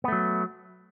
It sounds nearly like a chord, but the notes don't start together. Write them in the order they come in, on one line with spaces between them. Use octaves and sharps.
B3 A3 F#3